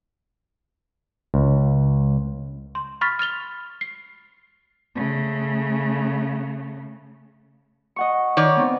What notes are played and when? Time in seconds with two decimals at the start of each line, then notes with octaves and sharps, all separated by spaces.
1.34 C#2
2.75 C6
3.01 B5 C#6 F6 A6 B6
3.19 F6 A6 F7 G7
3.81 C7
4.95 C#3 A3
7.96 D#5 F#5 C#6
8.37 D#3 C#5 D5
8.57 B3 C4